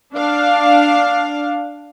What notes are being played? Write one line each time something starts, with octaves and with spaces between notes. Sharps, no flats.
D4 F5